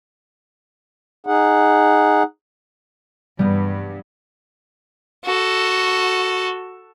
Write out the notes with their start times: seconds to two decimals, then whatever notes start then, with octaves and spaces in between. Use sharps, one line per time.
1.26 D#4 G#4 F#5
3.39 G2 G3 B3
5.25 F#4 A4